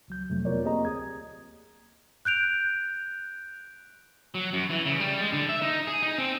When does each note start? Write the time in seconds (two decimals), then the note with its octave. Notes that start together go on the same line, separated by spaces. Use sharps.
0.08 C#2 F#3 G6
0.30 F2 C3 F#3 A3
0.45 B3 F4 A#4 C#5 D5
0.62 A#3 C4 G4 G#4 D#5 A#5
0.85 D2 D#6 G#6
2.25 F#6 G6 D7 F7
4.35 F#3
4.53 F#2
4.70 E3
4.86 C#3
5.00 G3
5.21 G#3
5.33 D3
5.49 E5
5.62 D#4
5.87 G#4
6.02 D#4
6.18 C4